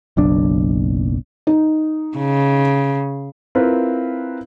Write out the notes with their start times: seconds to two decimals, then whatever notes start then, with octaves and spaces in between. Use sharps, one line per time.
0.17 F#1 B1 D4
1.47 D#4
2.17 C#3
3.55 C4 E4 F4 A#4 B4